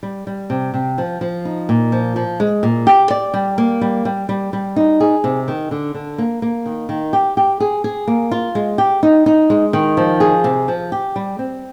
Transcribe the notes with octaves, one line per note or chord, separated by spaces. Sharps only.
G3
G3
C3
C3
F3
F3
D#4
A#2
F3
F3
G#3
A#2
G4
D5
G3
A#3
G3
G3
G3
G3
D#4
G#4
C3
D#3
D3
D3
A#3
A#3
D#3
D#3
G4
G4
G#4
G#4
A#3
F4
G#3
G4
D#4
D#4
G#3
D#3
F3
G#4
C3
F3
G4
G3
C4